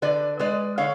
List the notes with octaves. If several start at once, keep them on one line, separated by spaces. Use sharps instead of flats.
D3 B4 D5
G#3 B4 D5
D3 C#5 F5